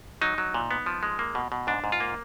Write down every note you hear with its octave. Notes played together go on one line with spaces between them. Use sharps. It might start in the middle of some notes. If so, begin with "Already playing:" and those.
F#3 D#4
F#3
A#2
B3
F3
G#3
A#3
B2
B2
G#2 D4
G#2
F4
A#3